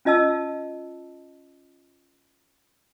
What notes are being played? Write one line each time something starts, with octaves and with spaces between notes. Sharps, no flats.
C#4 F4 D#5 A5 E6